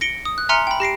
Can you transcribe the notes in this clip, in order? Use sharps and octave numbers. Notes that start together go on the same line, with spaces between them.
A#6 C#7 D7 G7
D#6
F#6
E5 G#5 A#5 C6 F6 C#7
G5 B5
G4 A#6 C7 D7